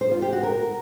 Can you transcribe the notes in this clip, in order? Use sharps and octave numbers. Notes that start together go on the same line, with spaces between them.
C5
F4
G4
F#4
A#4